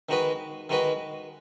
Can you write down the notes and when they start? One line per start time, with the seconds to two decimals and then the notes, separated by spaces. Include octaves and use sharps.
0.09 D#3 G#3 D#4 F#4 B4
0.69 D#3 G#3 D#4 F#4 B4